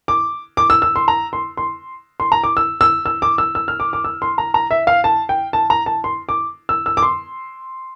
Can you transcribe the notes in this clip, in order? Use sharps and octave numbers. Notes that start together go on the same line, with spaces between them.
D6
D6
E6
E6
C6
A#5
C6
C6
C6
A#5
D6
E6
E6
E6
D6
E6
E6
F6
D6
D6
E6
C6
A#5
A#5
E5
F5
A5
G5
A5
A#5
A5
C6
D6
E6
E6
D6
C6